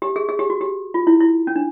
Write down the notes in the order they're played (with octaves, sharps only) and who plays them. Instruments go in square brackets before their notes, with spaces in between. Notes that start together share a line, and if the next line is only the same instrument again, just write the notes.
[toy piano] G4
G#4
G#4
G4
F#4
G4
F4
E4
E4
C#4
D4